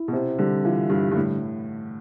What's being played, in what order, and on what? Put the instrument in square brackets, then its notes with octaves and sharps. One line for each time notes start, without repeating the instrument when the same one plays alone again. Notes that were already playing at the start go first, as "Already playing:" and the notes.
Already playing: [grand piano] E4
[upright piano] B2
[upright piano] C3 [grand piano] C4
[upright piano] D3 [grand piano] G3
[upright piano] E3 [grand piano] F4
[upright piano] G2 [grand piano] G3
[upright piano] G2
[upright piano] A2 [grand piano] D3